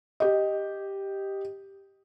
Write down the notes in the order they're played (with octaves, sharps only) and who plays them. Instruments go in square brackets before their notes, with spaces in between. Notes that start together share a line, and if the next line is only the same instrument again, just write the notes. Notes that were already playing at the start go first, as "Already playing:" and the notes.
[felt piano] G4 D#5